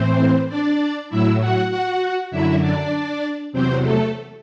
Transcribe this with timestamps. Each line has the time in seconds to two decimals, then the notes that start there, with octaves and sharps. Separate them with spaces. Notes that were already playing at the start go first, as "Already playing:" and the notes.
Already playing: A2 E3 C4 C5
0.49 D4 D5
1.09 A2 F#3 E4 E5
1.40 F#4 F#5
1.70 F#4 F#5
2.31 F#2 D3 F#3 E4 E5
2.61 D4 D5
3.53 E2 C3 F#3 C4 C5
3.82 A3 A4